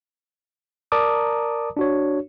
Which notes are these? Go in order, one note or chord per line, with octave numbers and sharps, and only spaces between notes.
A#4 D5 A5 A#5 D6 D#6
D4 F#4 C#5